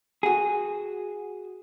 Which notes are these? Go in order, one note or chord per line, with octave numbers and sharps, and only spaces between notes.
F#4 G#4